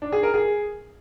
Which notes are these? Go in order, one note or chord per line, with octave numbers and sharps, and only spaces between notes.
D4
G#4
A#4
G#4